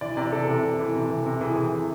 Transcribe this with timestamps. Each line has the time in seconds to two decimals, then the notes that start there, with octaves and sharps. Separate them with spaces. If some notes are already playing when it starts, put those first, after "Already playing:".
0.01 E3 D5
0.17 C3 D5
0.32 E3 A4
0.48 C3
0.63 C3
0.79 E3
0.95 C3
1.10 E3
1.26 C3
1.41 E3 G#4
1.57 C3
1.72 E3